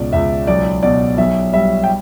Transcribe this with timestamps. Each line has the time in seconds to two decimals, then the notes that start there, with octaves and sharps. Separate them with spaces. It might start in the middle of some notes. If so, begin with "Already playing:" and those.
Already playing: C#2 B2 D5
0.13 C#2 E5
0.47 B1 D5
0.83 B2 D5
1.18 B1 E5
1.53 G3 E5
1.84 G5